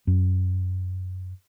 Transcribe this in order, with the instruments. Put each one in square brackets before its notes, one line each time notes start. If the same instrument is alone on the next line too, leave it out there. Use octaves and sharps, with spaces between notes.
[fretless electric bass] F#2